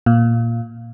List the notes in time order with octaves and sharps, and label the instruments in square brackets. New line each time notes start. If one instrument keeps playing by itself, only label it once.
[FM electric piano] A#2